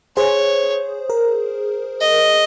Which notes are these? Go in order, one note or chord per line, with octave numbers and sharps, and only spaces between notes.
G#4 C5 C#5
A#4
D#5